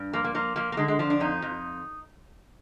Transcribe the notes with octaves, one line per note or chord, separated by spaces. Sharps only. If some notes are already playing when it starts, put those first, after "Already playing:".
Already playing: G2
F3 A#3
A#3
F3 A#3
F3 A#3
A#3
D3 G#3
G#3
F3 D4
D4
F2 D#4
F2